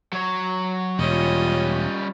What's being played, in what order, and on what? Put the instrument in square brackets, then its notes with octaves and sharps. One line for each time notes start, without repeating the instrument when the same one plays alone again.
[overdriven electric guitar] F#3 C#5
[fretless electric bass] E1 [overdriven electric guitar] G3 C#4 [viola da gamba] F4 C#5 D#5